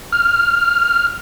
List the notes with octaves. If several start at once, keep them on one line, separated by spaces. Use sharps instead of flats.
F6